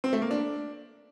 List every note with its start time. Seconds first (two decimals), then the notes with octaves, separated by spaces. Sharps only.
0.04 C4
0.13 A3
0.22 A#3
0.31 D4